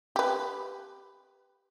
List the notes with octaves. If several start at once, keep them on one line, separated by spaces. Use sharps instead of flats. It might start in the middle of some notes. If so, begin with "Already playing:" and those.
G4 B4